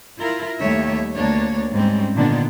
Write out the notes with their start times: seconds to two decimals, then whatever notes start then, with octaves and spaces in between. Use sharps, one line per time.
0.19 E4 F4 A#4
0.58 D#2 G3 A3 C#5 E5
1.13 D2 A#3 D4 C#5
1.71 G#2 G3 G#3 C4 C#4
2.15 A#2 D3 D#3 B3 D4